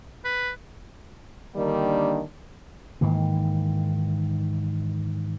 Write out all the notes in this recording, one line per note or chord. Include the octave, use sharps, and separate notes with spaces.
B4
D3 D#3 G3 A#3 D4
G#2 D#3 E3 A#3